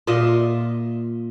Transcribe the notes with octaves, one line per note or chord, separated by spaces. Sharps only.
A#2 F4 D#5 E5